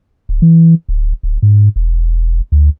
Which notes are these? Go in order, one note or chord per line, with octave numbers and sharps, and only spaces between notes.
D1
E3
D1
D1
G#2
E1
D2